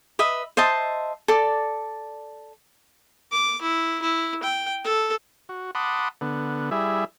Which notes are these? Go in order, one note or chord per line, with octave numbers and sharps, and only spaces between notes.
B4 D#5 E5
C5 D#5 E5 A5
A4 D5
D6
E4
E4
G5
A4
F#4
F#5 A5 B5 C6 D6 D#6
D3 B3
G3 E4 G#4 E5